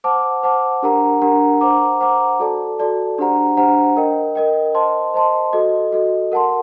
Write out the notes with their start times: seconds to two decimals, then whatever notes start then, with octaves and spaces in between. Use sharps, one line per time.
0.04 C5 F#5 A5 D6
0.43 C5 F#5 A5 D6
0.82 D4 G4 A#4 F#5 A#5
1.22 D4 G4 A#4 F#5 A#5
1.61 C5 F#5 A#5 D6
2.00 C5 F#5 A#5 D6
2.39 F#4 A4 D5 A5
2.79 F#4 A4 D5 A5
3.18 D4 G4 C5 F#5 A#5
3.57 D4 G4 C5 F#5 A#5
3.97 A#4 D#5 G5
4.35 A#4 D#5 G5
4.75 C5 D#5 A5 C6
5.14 C5 D#5 A5 C6
5.53 F#4 A4 D#5
5.92 F#4 A4 D#5
6.32 A#4 F#5 A5 C6